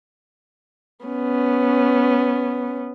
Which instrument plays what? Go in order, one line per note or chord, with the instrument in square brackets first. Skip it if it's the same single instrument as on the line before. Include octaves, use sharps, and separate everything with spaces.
[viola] B3 C#4